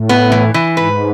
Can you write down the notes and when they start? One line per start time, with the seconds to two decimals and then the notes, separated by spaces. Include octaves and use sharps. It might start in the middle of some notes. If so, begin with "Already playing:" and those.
Already playing: A2
0.09 B3
0.32 E3
0.54 E3
0.77 G#2 B4